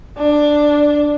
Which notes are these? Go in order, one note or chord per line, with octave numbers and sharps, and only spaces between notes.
D4